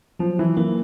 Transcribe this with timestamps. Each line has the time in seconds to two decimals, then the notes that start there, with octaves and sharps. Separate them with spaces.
0.19 F3 F#3
0.39 E3
0.57 E3 A#3